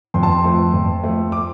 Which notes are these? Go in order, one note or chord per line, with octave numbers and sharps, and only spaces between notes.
F2 C6
A5
C6
F3 A3
F2
F3 A3
D6